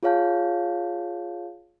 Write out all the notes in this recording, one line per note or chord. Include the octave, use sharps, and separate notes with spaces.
F4 G#4 C#5 F5 A5 G6